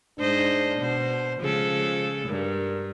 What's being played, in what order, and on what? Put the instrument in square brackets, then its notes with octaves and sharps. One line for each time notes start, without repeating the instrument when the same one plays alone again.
[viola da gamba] G#2 C5 D#5 [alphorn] D4
[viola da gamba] B2 C5
[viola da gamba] C#3 G#3 A4 [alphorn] F3
[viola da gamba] G2 [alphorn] A#4